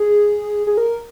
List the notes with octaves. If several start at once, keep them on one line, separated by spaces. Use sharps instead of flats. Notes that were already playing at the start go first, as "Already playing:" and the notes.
Already playing: G#4
G#4
A#4